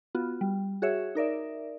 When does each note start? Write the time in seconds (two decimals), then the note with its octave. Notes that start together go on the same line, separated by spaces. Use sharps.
0.15 B3 F4 F#4
0.41 G3
0.82 F#4 G#4 C#5 E5
1.15 D#4 A#4 D5 E5